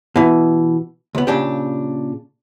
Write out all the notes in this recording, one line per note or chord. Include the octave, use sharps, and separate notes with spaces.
B2 E3
C#2 B3
A#2 C#3 D4 G4